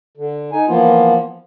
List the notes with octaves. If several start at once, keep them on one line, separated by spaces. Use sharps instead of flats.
D3
D#4 G#5
E3 F3 A#3 B3 F4